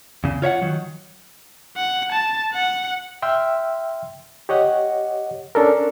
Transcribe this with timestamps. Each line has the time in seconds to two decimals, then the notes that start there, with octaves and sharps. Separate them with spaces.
0.24 E2 C#3
0.42 F4 C#5 E5 F#5
0.62 D#3 F#3
1.77 F#5
2.12 A5
2.54 F#5
3.22 E5 G5 C6 E6 F6
4.49 G4 C#5 D#5 F#5
5.55 C#4 D4 A4 A#4